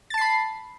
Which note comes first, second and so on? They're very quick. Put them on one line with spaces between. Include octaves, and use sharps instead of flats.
A6 A5 C7 B5